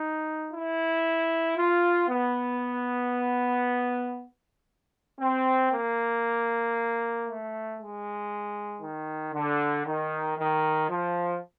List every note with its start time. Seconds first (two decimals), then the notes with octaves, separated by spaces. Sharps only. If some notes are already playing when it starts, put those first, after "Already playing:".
Already playing: D#4
0.52 E4
1.56 F4
2.08 B3
5.19 C4
5.71 A#3
7.27 A3
7.79 G#3
8.82 D#3
9.34 D3
9.86 D#3
10.38 D#3
10.89 F3